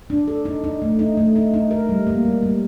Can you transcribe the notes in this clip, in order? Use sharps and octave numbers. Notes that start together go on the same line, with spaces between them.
D4
A4
D#4
D#4
A3
D#4
A3
D#4
D#4
A#4
G3
A#3
G3
G3